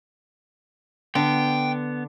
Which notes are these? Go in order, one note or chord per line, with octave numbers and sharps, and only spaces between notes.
D3 B3 G5